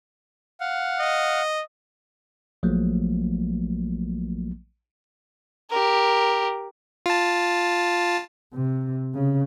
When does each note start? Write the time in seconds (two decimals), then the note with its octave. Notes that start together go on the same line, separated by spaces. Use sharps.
0.60 F5 F#5
0.99 D#5
2.63 A#1 F3 F#3 A3 A#3
5.70 G4 A#4
7.06 F4 A5
8.54 C3
9.15 C#3